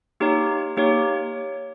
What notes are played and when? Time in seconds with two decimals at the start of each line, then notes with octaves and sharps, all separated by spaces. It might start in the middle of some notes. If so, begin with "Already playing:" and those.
0.20 A#3 D#4 G4 C#5
0.77 A#3 D#4 G4 C#5